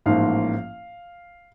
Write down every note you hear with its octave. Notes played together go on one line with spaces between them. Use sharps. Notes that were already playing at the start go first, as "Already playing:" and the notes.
A1 G#2 F3 A#3 F5